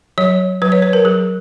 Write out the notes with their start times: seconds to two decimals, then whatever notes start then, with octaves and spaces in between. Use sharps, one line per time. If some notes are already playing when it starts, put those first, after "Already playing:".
0.18 F#3 C#5
0.62 F#3 B4
0.72 C#5
0.82 B4
0.93 A#4
1.05 F#3 G#4